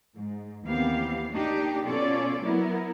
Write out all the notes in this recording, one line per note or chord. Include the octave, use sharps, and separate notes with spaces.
G#2
D#2 E3 B3 C4 G4 F5
A#3 D4 D#4 G4
B2 C#4 F4 A4 D5
F#3 B3 E4 A#4